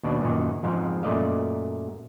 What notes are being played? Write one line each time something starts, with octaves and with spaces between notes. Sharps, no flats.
D#2 B2 D4
F#2 A#2 D#3
F2 G#2 F3 F5
F#2 A#2 A3 D5 D#5 F5